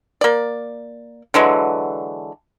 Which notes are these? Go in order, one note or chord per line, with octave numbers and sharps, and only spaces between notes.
A#3 D5
D3 E3 F#3 G#3